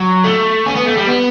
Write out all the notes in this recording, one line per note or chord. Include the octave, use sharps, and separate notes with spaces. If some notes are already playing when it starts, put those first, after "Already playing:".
Already playing: F#3
A3
C#4
B3
A3
G3
B3